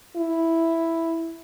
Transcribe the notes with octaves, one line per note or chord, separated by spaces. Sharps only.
E4